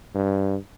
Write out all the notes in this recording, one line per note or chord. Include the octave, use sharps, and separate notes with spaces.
G2